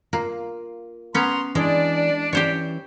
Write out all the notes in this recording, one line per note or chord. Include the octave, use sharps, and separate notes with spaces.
A#3 F4
B3 C#4 A#5 C6
E3 G#3 D4 D5
E3 C#4 G4 C5 C#5